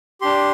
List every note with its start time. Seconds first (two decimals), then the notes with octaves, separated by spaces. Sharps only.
0.21 D4 G4 C6